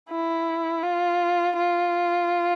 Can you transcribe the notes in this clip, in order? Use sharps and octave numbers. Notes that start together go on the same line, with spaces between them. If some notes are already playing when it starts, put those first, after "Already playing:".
E4
F4
F4